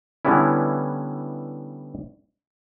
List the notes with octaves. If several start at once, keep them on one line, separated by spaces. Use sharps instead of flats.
D3 E3 G3 B3 C#4 E4